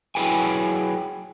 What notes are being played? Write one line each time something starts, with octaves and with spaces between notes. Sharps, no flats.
F#3 E4 G#4 B4 G5 G#5